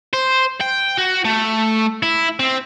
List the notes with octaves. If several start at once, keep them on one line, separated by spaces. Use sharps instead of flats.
C5
G5
F#4
A3
E4
C4